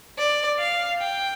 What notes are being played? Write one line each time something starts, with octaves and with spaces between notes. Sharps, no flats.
D5
F5
G5